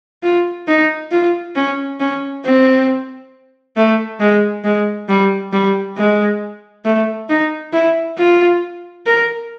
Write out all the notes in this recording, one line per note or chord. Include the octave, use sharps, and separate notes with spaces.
F4
D#4
F4
C#4
C#4
C4
A3
G#3
G#3
G3
G3
G#3
A3
D#4
E4
F4
A#4